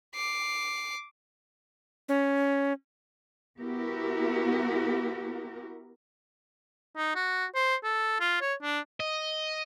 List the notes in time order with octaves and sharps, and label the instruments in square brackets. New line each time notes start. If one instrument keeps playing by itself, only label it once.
[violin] D6 C7
[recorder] C#4
[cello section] B3 E4 F#4 G4 A#4
[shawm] D#4
F#4
C5
A4
F4
C#5
D4
[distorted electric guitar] D#5